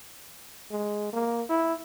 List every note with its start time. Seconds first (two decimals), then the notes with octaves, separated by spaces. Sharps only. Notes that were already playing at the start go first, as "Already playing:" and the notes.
0.71 G#3
1.13 A#3
1.49 E4